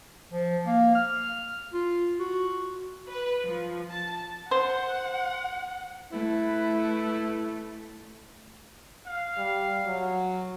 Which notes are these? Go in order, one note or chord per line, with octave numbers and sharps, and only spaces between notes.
F3
A#3
F6
F4
F#4
B4
F3
A5
C5 F#5
A3 E4 B4
F5
G3
F#3